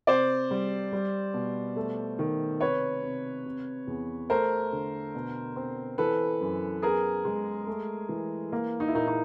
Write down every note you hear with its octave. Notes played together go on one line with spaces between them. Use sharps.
C3 C5 D5
G3
G3
B2
A3
D#3
C3 B4 C#5
C3
C3
E2
A3 A#4 C5
D3
B2
C4
E3 A4 B4
F#2
B3 G#4 A#4
G#3
A3
E3
A#3
D#4
E4
A#2 D#4
D#4